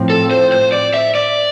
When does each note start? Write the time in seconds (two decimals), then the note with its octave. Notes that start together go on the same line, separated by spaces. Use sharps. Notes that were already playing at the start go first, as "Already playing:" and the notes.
Already playing: A2 F3 C4
0.10 A4
0.31 C5
0.52 C5
0.72 D5
0.94 E5
1.15 D5